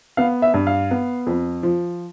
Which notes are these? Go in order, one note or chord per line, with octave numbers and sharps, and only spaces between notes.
B3 F5
E5
G2
F5
B3
F2
F3